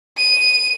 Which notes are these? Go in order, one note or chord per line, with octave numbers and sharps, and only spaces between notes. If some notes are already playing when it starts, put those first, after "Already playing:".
D#7